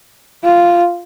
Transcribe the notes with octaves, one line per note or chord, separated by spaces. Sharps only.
F4